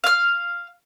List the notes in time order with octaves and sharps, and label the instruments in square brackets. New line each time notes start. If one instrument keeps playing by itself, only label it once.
[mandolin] F5 F6